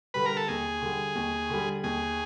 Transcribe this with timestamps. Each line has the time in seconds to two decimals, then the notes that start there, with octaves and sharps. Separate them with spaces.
0.14 D3 G3 B4
0.26 A#4
0.37 A4
0.48 D#2 G#4
0.82 D3 G3
1.15 D#2
1.50 D3 G3
1.84 D#2 G#4